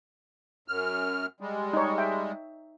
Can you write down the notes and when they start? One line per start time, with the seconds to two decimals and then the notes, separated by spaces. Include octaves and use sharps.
0.68 F#2 F6
1.40 G3 G#3
1.73 D#4 C#5
1.98 E5 G5